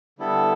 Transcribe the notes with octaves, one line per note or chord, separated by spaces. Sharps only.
D3 G3 B3 E4 A4